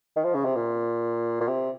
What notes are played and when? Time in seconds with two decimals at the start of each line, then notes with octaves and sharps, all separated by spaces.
0.16 D#3
0.24 F3
0.34 C#3
0.45 C3
0.56 A#2
1.41 A#2
1.48 C3